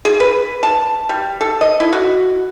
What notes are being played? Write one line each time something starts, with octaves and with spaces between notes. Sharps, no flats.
G#4
B4
A5
G3
A4
D#5
E4
F#4